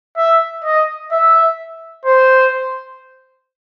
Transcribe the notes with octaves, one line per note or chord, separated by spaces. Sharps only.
E5
D#5
E5
C5